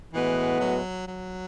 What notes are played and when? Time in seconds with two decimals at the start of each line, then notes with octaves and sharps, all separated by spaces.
0.13 A2 E3 G#3 B3 F#4
0.60 F#3
1.07 F#3